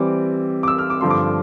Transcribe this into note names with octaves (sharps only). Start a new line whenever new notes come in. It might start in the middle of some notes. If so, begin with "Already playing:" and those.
Already playing: E3 G3 C4 D6
D6
E6
F6
D6
G2 D3 F3 C6
D6